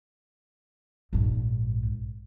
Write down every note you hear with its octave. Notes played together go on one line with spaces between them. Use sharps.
A#1 G#2